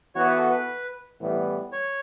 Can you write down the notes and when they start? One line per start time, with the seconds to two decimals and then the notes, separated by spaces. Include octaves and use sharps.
0.15 E3 B3 F#4 C#5
0.26 B4
0.38 A4
0.50 B4
1.20 A2 E3 G3 B3
1.73 C#5